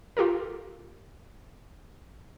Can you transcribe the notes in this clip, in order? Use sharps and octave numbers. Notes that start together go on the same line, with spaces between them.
F4 G4 A4 A#4